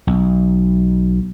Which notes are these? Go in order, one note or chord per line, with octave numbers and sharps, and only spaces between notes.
B1